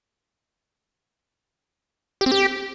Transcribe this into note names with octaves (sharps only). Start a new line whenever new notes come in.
G4
C4
G4